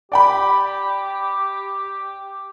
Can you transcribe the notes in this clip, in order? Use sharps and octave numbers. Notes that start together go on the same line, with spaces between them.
G4 D5 G5 B5